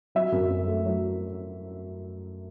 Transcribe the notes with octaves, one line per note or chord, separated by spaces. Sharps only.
F#3 E5
F#2
F#2
A3
F#3